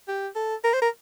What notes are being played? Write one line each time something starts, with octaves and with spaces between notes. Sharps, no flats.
G4
A4
A#4
C5
A#4